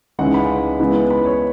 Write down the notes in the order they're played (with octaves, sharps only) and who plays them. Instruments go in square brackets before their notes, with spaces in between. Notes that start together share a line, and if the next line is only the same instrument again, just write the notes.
[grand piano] C#2 C#3 E3 G#3 D#4 F#5
B5
C#3 E3 G#3 B3 E4
B5
C#5